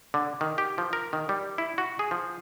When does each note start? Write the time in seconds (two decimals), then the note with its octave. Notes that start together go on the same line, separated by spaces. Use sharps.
0.14 D3
0.41 D#3
0.58 G4
0.78 F3
0.93 A#4
1.13 D#3
1.29 G3
1.58 E4
1.78 F#4
1.99 G#4
2.11 F3